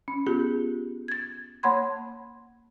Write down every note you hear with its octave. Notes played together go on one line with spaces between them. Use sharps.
C#4
B3 C#4 F4 G4 G#4
G#6 A6
A#3 C#5 F#5 B5 C6 G#6